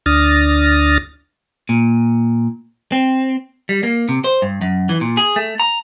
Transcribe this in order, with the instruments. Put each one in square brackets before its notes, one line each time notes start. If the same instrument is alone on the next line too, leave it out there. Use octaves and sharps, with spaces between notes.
[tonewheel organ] D2 D4 D#6 F6 A6 A#6
[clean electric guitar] A#2
C4
G3
A#3
C3
C5
G2
F#2
E3
A#2
G#4
A3
A#5